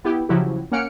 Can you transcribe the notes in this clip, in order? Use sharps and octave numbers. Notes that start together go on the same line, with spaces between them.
B3 E4 G4
C#3 F3 F#3 E4 F#4 G4
A#3 C#4 F#5 F6 C#7 D7